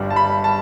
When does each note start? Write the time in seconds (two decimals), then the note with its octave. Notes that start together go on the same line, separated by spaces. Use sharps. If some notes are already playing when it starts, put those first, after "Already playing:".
Already playing: G1 G2 G3
0.10 A5
0.16 B5
0.44 A5